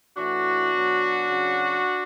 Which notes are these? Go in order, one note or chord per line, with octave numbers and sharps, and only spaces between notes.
A2 E3 D4 F#4
B2 F#3
C#3 F#3